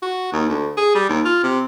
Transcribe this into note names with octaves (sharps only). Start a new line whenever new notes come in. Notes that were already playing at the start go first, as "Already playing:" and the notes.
F#4
D#2
D2
G#4
G3
D#2
F4
C3